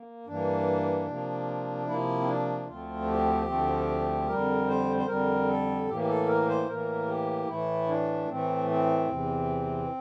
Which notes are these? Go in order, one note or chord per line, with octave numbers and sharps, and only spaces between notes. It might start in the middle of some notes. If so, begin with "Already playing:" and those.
Already playing: A#3
G2 E3 A#3 D4
C3 F3 A#3
C3 F3 A#3 E4
C4
D4
D2 D3 F3 A3 C4 F4
G4
D2 D3 F3 A3 C4
F2 D3 G3 A#4
C5
C5
F2 D3 G3 A#4
A4
A2 E3 A#3 G4
G4
A4
A#4
C5
A2 E3 A#3 A#4
G4
A2 E3 A3 E4
D4
A2 E3 A3 C4
C4
E2 C3 E3